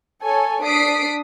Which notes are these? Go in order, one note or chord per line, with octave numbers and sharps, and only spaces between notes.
A4 C#5 G#5
D4 D#6 B6 C7 D7